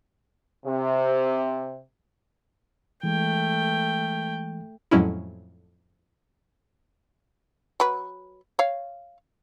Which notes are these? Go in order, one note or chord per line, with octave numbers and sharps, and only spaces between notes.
C3
E3 G#3 A3 G5
F2 A2 F#3 G#3 C#4 E4
F#3 B4
C#5 F5